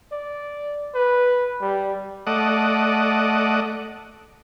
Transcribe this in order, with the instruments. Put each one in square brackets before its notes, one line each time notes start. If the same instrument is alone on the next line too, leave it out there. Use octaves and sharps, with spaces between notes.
[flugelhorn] D5
B4
G3
[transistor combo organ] A3 D5 D#5 F#5